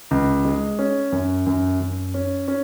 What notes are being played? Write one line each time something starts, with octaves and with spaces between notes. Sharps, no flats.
C#2
G#3
C#4
F#2
F#2
F#2
C#4
C#4